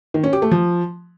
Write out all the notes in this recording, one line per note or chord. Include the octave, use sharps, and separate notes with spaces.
D#3
C#4
G4
A3
F3